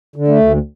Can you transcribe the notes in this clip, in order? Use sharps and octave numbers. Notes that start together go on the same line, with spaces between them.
D3
A3
D2